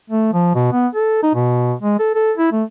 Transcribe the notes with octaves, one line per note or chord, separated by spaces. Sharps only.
A3
F3
B2
B3
A4
D#4
B2
G#3
A4
A4
E4
A3